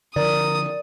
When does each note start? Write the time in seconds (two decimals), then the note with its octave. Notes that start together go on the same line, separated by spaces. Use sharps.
0.16 D3 F3 A#4 D5 D#6